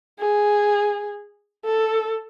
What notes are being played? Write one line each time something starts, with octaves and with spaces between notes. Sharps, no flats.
G#4
A4